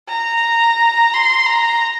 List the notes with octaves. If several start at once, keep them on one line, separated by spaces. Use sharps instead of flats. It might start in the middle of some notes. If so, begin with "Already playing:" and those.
A#5
C6
A#5